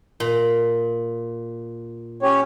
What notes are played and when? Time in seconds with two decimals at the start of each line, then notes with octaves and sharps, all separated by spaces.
0.20 A#2
2.23 C#4 G4 C#5